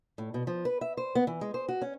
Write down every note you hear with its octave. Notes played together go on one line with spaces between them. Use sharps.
A2
B2
F3
B4
E5
C5
B3
E3
G#3
C5
F#4
C#4